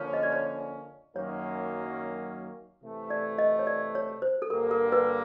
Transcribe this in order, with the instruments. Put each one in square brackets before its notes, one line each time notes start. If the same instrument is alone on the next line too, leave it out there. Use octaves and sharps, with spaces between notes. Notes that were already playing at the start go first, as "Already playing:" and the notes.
Already playing: [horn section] D3 F3 A#3 C#4 [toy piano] C#5
[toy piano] D#5
D5
C#5
[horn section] F#2 D#3 F#3 A#3 C#4 [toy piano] C#5
[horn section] C3 E3 A3
[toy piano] D5
D#5
C#5
D5
C#5
C5
A4
[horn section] G2 D3 G3 A#3 [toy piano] A#4
[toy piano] A#4
B4